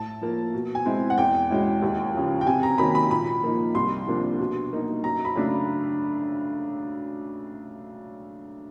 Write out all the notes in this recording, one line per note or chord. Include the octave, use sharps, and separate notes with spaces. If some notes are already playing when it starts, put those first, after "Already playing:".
Already playing: A2 A5
F3 A#3
B2
G#5
G#3 C4 E4
F#5
E2 G5
B2 G#3 C#4 E4
D#2
C#3 F3
G5
C3 G#5
A#5
D#3 F#3 A#3 C#4 B5
B5
A#2 B5
F3 A#3 D#4
C2 C6
C3 F3 A#3 D4
B2
F#3 A#3 D#4
F#2 A#5
B5
C#3 F#3 A3 D4